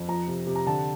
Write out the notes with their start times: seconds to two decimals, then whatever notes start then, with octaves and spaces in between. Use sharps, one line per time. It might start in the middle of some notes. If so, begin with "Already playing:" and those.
Already playing: F2
0.09 F3 A#5
0.28 C3
0.47 C3
0.56 A#5
0.67 D3 A5